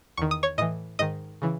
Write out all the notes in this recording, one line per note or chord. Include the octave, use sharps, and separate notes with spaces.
E2 D#3 C#6
D#6
C#5 C#6
A2 E3 D#5 D#6
G#2 D#3 D#5 D#6
C#3 E3